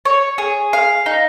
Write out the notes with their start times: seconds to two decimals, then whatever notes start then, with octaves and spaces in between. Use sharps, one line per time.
0.05 C#5
0.38 G#4
0.73 F5
1.06 D#4